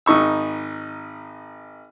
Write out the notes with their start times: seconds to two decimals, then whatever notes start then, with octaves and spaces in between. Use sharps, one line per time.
0.06 G#1 D#4 C#6 E6